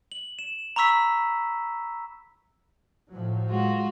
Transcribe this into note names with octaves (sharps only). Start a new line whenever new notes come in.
F#7
E7
A#5 B5 C#6 E6 B6
A2 F3 F#3
G#3 F4 F#4